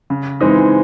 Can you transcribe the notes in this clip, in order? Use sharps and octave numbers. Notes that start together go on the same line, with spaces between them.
C#3
E3 G#3 C4 D#4